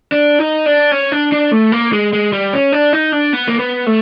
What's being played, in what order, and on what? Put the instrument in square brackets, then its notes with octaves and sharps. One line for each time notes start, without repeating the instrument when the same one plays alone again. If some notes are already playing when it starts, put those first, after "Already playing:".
[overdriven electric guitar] D4
D#4
D4
C#4
D4
D4
A3
A#3
G#3
G#3
G3
C#4
D4
D#4
D4
B3
A#3
B3
A3